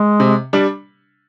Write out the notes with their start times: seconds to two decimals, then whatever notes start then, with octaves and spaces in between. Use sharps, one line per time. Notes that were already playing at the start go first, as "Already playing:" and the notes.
Already playing: G#3
0.20 C3
0.53 G3 D4